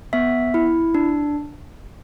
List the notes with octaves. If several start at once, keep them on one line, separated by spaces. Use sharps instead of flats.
B3 E5
E4
D4